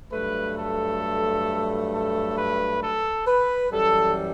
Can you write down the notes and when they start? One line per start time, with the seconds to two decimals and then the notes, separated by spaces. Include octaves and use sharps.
0.12 G2 F#3 A3 B4
0.57 A4
1.92 A4
2.37 B4
2.82 A4
3.26 B4
3.72 F#2 E3 G3 A4